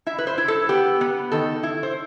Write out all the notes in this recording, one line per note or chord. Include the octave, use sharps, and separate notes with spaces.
E4 E5
B4
C5
E4
A4
B3 G4
B3
D#3 A4
E4
C5